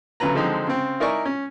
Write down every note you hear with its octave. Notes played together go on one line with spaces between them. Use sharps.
D2 C#3 F#3 B4 A#5
D3 F3 F#3 G#3 C4 D#4
C#3 C4
D#4 E4 A#4 D5 G#5 C#6
C#4